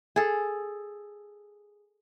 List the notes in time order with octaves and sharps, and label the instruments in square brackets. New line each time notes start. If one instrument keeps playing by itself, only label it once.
[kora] G#4 A4